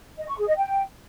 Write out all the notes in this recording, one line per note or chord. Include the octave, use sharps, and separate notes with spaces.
D#5
C#6
G#4
D#5
G5